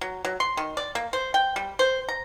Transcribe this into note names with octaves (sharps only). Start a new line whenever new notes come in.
F#3
F#3
C6
D#3
D5
A#3
C5
G5
G3
C5
A#5